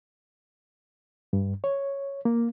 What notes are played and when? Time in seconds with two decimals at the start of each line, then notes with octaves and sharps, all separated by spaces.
1.33 G2
1.64 C#5
2.25 A#3